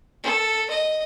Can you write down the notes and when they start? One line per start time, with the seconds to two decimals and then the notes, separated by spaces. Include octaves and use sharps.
0.23 A4
0.70 D#5